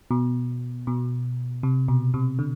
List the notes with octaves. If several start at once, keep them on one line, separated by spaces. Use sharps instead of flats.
B2
B2
C3
B2
C3
D3